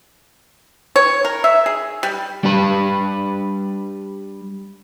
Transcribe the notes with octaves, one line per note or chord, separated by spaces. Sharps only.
C#5
A#4
E5
G#4
G3
G3 D4 G4 B4